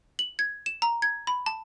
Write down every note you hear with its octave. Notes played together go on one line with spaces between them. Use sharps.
F#7
G#6
E7
A#5
G#6
B5
A5